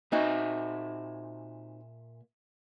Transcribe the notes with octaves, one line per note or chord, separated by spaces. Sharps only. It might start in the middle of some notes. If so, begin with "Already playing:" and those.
A#2 C4 D#4 F#4 E5 G#5